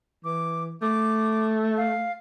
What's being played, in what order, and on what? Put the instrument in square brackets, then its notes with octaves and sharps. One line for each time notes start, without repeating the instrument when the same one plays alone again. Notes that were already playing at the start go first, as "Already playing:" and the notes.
[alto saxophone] E3 [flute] D6
[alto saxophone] A3 [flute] D6
[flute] F5